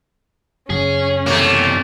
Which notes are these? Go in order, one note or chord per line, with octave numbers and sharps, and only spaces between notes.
F#2 C#3 C#4 G#4
E2 C3 A3 A#3